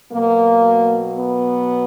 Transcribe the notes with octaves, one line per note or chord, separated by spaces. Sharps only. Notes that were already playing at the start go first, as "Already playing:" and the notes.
B2 F#3 A#3
B3